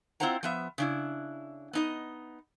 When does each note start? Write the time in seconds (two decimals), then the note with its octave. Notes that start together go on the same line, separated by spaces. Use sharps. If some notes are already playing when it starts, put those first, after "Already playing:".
0.20 C4 E4 F4 C5 F#5 A#5
0.43 F3 B3 E5
0.78 C#3 D4 E4
1.73 B3 D#4 D#5